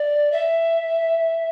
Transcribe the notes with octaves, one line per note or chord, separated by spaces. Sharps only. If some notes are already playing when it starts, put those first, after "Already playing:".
Already playing: D5
E5